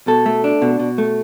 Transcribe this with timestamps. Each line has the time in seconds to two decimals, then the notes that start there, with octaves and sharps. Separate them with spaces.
0.07 B2 A4
0.26 A3
0.44 D4
0.62 B2
0.79 B2
0.98 A3